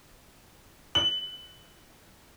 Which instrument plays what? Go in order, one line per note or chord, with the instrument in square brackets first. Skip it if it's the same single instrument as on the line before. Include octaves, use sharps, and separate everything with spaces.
[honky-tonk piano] F#7